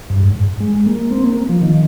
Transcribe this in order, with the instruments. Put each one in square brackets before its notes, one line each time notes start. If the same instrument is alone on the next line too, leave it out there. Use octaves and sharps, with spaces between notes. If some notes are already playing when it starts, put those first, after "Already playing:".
[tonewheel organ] G2
G#2
G#3
A#3
C4
A#3
F3
D#3